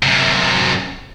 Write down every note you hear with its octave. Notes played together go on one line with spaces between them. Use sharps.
F#2 C3